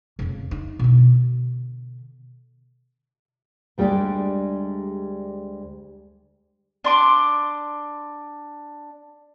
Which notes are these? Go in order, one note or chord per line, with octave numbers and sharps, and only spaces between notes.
F2 C#3
D#4
B2 D3
D2 G3 G#3 D4 G4 D5
D4 C6 D6